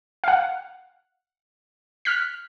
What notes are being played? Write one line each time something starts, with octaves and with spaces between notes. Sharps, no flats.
F5 F#5
F6 F#6 B6